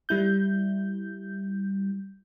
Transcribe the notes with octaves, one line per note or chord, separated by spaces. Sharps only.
G3 E4 G6